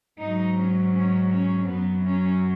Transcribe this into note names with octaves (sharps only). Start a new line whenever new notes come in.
G#2 F#3 D#4
C#4
C#4
C#4
F#2 F#3 B3
C#4